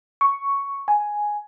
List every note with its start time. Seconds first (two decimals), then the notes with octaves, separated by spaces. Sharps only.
0.21 C#6
0.88 G#5